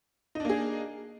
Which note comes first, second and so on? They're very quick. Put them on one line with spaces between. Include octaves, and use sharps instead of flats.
D#4 D4 A#3 G#4